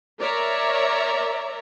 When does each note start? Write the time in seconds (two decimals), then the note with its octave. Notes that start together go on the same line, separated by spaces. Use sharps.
0.20 A#4 C#5 D5 E5 A#5